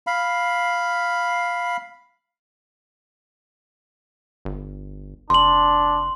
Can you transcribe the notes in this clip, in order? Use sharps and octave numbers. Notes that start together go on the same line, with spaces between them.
F5 B5
G1
F1 D4 C6 F#7